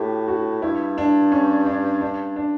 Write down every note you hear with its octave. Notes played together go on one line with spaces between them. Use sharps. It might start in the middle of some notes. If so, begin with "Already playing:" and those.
Already playing: A2 F#4 G4
F#4
G2 E4
D4
C#4
D4
D4
D4